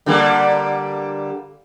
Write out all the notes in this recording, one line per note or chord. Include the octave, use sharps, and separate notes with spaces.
D3 G3 A#3